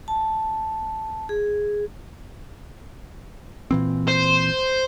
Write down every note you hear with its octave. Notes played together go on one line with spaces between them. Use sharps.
A5
G#4
A#2 E3 C4
C5